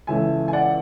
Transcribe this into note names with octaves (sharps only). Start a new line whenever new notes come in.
C#2 C#3 E3 A3 E5 G#5
G#5
D5 F#5